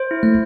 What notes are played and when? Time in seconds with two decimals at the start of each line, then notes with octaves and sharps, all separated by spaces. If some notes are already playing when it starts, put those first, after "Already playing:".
Already playing: C5
0.11 E4
0.23 A3